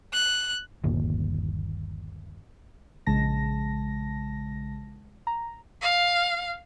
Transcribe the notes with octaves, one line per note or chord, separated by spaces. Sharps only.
F#6
G1 D#2 A#2
A#1 C#3 G#3 A5 A#6
A#5
F5